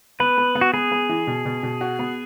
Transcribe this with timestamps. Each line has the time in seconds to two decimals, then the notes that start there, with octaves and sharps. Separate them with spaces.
0.20 B3 B4
0.38 B3
0.55 B3
0.61 F#4
0.73 B3 G#4
0.92 B3
1.09 E3
1.27 B2
1.45 B2
1.63 B2
1.81 F#4
1.99 B3